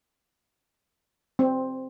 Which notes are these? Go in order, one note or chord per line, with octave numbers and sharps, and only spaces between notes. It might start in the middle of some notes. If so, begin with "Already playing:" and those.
C4